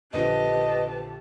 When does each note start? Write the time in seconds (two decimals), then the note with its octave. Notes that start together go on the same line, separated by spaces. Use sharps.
0.13 A#1 D3 F3 G4 B4 D#5 A5